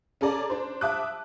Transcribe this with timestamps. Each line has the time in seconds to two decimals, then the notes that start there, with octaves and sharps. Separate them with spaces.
0.21 C#4 G#4 A4 D5 A#5
0.50 D4 C5
0.81 E5 A5 D6 D#6 F#6